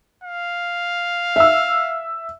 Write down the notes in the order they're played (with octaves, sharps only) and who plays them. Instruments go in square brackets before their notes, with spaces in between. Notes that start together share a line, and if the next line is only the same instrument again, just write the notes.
[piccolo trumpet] F5
[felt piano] E5 E6